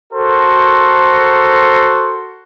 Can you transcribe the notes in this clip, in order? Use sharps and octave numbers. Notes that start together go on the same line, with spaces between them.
F#4 A4 A#4 C5